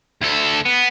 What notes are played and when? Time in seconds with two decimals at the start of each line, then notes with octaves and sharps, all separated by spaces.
0.21 D2 A4
0.65 B3